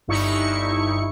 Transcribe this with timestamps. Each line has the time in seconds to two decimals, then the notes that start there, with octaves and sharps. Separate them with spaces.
0.08 G1 G2 D#4 E4 C#6 C#7